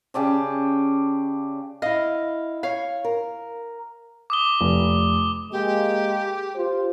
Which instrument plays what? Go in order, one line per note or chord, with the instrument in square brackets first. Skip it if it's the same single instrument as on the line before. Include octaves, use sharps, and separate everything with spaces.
[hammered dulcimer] C#3 G4 D5 A5
[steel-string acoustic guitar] E4 F5 [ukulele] D#5
[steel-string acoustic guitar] C#5 [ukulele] F5
[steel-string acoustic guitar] A#4
[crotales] D6 D#6 G7
[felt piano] F1
[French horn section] G#3 A#3 [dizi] G4
[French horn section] F4 G4 C5